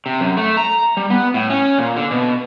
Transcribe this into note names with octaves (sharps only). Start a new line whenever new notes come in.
C3
F#2
A3
A#5
G3
B3
A2
C#4
A#2
D3
B2